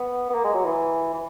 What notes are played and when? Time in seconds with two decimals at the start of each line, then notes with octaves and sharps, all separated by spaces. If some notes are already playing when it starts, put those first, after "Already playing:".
Already playing: B3
0.30 B3
0.34 A#3
0.44 G#3
0.54 F#3
0.64 E3
1.14 E3